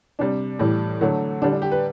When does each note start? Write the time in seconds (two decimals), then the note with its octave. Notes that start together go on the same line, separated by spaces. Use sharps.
0.19 C3 G3 D4
0.59 A2 E3 G3
1.01 D3 F#3 A3
1.42 D3 G3 D4
1.52 D4
1.62 G4
1.72 B4